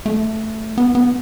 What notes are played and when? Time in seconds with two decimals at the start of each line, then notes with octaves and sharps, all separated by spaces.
0.06 A3
0.78 B3
0.95 B3